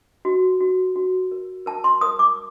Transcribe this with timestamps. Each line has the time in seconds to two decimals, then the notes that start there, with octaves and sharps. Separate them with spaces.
0.25 F#4
0.61 F#4
0.96 F#4
1.32 A#4
1.66 A#4 A5
1.84 C6
2.01 A#4 D#6
2.19 D6